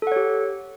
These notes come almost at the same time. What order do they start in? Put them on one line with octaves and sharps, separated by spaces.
A4 F#5 C#5 G4